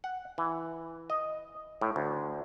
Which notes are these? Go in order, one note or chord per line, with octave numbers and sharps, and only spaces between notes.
F#5
E3
D#5
A2
D2